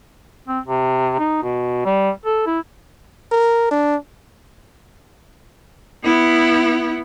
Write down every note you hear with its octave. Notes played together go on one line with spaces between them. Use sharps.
C4
C3
D#4
B2
G3
A4
E4
A#4
D4
B3 E4